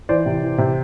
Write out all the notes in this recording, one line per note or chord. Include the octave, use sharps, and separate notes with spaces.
E3 C5 D5
C3
E3
C3